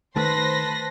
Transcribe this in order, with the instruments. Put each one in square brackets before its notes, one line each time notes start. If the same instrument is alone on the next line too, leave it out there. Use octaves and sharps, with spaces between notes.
[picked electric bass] D#3 A3 [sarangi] B4 [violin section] C5 C6 A#6 [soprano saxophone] A5